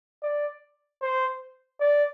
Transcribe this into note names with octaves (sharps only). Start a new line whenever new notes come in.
D5
C5
D5